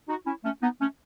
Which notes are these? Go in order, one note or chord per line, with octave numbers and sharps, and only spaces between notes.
D#4 F#4
C#4 E4
A3 C#4
B3 D#4
A3 C#4